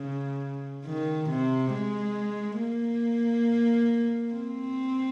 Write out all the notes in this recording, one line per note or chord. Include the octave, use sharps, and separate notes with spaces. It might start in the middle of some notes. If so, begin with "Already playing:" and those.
Already playing: C#3
D#3
C3
G#3
A#3
C4